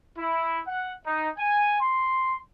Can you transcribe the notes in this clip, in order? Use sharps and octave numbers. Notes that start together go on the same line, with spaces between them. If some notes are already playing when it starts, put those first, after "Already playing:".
E4
F#5
D#4
G#5
C6